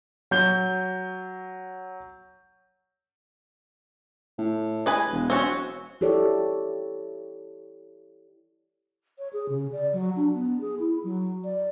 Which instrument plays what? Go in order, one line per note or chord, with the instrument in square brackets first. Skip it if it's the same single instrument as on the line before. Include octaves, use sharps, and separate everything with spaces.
[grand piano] F#3 G6 G7
[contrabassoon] A2
[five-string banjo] G#3 B4 G#5
[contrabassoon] E1
[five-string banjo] C4 C#4 F#4
[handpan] E4 G4 A4 C#5 D5
[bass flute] C#5
G#4
C#3
D5
F#3
D4
B3
G#4
E4
F#3
D5